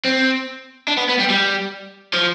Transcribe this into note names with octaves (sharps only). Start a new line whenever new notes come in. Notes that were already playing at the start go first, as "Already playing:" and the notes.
C4
D4
B3
B3
G3
G3
F3